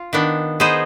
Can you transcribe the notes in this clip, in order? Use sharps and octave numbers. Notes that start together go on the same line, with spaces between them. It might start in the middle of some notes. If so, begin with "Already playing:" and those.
Already playing: F4
D#3 B3 D4
B3 D#4 G#4 C5 D#5